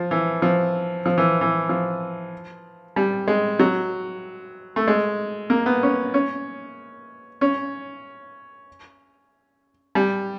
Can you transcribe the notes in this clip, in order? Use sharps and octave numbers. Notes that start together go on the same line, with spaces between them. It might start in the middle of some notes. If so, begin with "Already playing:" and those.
Already playing: F3
E3
F3
F3
E3
E3
F3
G3
G#3
F#3
A3
G#3
A#3
B3
C#4
C#4
C#4
G3